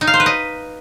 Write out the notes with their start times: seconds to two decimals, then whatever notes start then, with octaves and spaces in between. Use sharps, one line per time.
0.01 D#4
0.07 F5
0.14 C5
0.20 B4
0.26 D#5